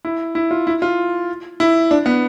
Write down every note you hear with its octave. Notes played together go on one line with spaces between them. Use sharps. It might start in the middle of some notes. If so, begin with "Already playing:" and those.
E4
E4
F4
E4
F4
E4
D4
B3